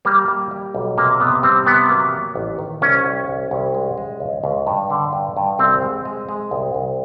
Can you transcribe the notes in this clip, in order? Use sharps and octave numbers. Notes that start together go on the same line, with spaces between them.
G3 A#3
G3
G3
B1
C3 A#3
C3 B3
G3 C4
C3 B3
F#3 A#3
F#3
A1
D#3
C2 C#4
C2
C2
C2
G#3
G#3
C#2
C#2
G2
D3
G2
G2
C2 C4
G#3
G#3
G#3
C2
C2